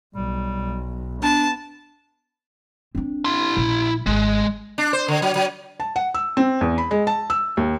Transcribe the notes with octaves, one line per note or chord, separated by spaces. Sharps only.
B1 G3
B3 D4 A5
C4 D4
E4 C6
A#1
G#1 G#3
D4
C5
D3
F#3
F#3
A5
F#5
E6
C4
E2
B5
G#3
A5
E6
D#2